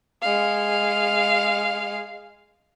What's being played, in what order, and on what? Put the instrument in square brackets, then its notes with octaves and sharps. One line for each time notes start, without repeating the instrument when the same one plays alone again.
[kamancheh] G#3 F5